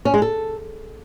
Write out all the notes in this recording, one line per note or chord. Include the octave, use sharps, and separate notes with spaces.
C#4
G#3
A4